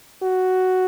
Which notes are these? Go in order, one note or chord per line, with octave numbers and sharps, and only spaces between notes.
F#4